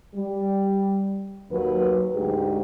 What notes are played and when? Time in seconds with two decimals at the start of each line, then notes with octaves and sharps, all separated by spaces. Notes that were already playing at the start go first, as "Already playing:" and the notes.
0.14 G3
1.51 D#2 F#3 B4
2.14 D2 G#2 G4 G#4